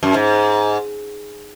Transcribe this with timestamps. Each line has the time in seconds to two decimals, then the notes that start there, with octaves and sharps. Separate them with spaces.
0.03 F#2
0.14 G#2